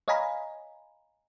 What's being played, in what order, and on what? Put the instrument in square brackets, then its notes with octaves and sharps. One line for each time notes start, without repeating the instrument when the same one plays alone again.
[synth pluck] C#5 D#5 F5 G#5 A#5 B5